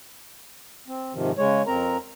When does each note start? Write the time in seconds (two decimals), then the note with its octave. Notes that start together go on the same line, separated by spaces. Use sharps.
0.88 C4
1.14 G#2 C3 D#3 F3
1.38 C#3 G#3 C#5
1.67 F2 C4 A#4 A#5